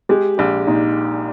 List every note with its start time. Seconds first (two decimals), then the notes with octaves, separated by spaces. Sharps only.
0.09 G#3 G4
0.38 A#1 G4
0.67 A#2 D#4